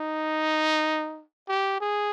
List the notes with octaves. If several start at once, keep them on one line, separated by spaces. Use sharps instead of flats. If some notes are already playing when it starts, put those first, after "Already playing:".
Already playing: D#4
G4
G#4